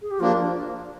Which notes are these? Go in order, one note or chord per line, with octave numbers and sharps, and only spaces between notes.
G#4
G4
F3 A#3 D4 F4